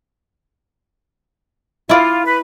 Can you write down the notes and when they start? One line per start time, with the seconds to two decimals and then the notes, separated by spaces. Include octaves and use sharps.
1.89 E4 F4 D5
2.25 B4